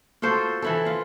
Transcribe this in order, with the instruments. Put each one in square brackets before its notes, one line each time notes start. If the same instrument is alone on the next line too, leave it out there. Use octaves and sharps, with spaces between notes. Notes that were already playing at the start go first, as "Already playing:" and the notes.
[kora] F4 F#4 A4 C5
E3 E4 A4
F4 F5